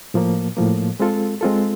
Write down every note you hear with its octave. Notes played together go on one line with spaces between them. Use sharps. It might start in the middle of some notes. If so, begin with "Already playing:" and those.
A2 F3 A#3
A2 F3 A#3
G#3 C4 F4 A4
G#3 C4 F4 A4